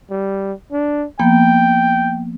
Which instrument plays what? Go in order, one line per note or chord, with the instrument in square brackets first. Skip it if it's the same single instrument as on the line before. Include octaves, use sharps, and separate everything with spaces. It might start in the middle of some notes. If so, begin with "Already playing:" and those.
[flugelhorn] G3
D4
[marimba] F3 A#3 B3 [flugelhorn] G5